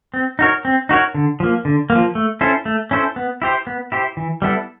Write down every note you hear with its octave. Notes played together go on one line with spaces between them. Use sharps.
C4
D#4 F#4 A#4 C#5
C4
D#4 F#4 A#4 C#5
D3
F3 A#3
D3
A#3
F3
A3
C#4 E4 A4 C5
A3
C#4 E4 A4 C5
B3
E4 G4 C5
B3
E4 G4 C5
E3
G3 B3 E4 A4